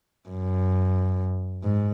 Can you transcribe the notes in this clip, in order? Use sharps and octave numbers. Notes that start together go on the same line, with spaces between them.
F#2
G#2